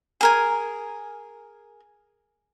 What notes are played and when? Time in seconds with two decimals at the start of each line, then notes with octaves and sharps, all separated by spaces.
0.21 G#4 A#4 G#5